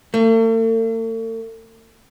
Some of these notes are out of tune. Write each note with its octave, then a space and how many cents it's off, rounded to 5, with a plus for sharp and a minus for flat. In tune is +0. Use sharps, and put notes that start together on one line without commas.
A3 +45